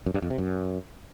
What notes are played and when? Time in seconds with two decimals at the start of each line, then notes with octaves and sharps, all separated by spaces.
0.06 F#2
0.14 G2
0.22 F2
0.30 C3
0.38 F#2